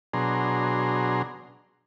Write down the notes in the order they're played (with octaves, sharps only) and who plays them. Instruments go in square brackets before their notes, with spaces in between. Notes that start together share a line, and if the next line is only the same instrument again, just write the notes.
[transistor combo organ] B2 F#3 D4 G#4 A#5 C6